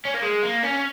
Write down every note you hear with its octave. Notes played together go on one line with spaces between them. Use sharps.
C#4
A#3
G#3
A#3
C#4